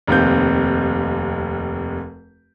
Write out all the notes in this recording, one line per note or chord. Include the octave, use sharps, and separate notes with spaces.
F1 D#2 C4 G6